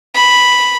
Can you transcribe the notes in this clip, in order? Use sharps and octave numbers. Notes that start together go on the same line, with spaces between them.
B5